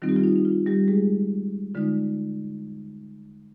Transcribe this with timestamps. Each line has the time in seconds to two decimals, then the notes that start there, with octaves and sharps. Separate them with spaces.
0.02 D#3 G3 C4 D#4 F4
0.09 G4
0.16 F4
0.24 D#4
0.36 D#4
0.45 F4
0.66 G3 G4
0.88 G#3 G#4
1.74 D3 G#3 D#4 F4